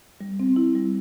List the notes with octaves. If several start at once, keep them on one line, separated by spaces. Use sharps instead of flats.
G3
C4
E4
G3